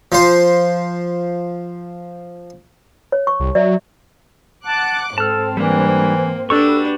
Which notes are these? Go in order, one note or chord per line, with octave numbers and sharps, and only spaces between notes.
F3 C5
C#5
C#6
C2
F#3 D5 E5
F#5 A5 D6 F#6
G#2 C4 A4 A5 F6
E3 G3 A#3 D4
D4 F#4 G4 A4 B4 C#6